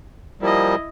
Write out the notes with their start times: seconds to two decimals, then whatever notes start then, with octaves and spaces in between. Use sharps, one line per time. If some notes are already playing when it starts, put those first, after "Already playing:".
0.41 F3 G3 A#3 E4 D#5